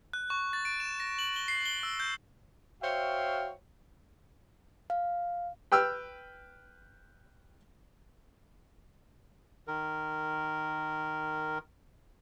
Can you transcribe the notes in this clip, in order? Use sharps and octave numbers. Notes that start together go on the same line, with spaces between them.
F#6
C#6
A6
D7
E7
A#6
F#7
G7
C7
G7
E6
G6
F#4 C5 C#5 E5 F5 G5
F5
B4 G5 E6 F6
D#3 A#4